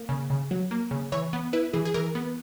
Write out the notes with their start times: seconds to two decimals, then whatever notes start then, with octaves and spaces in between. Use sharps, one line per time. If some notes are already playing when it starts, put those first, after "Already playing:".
Already playing: A#3
0.09 C#3
0.30 C#3
0.51 F#3
0.71 A#3
0.91 C#3
1.12 E3 C#5
1.33 B3
1.53 E4 B4
1.73 E3 G#4
1.85 G#4
1.94 E3 A#4
2.15 B3